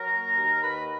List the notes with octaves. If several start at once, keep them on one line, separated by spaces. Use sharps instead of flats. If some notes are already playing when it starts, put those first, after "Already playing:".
Already playing: F#3 A#4 A#5
A#3
D#2
D#3 B4 B5